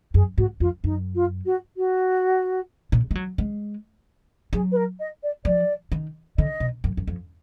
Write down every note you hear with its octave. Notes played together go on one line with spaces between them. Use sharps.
F#2 G#4
G#2 F#4
F2 F4
F#2 D#4
F4
F#4
F#4
A#2
G#3
F#3
G#3
F#3 G#4
B4
A#4
D#5
D5
F3 D5
D#3
D3 D#5
B2
F#2
F#2
F2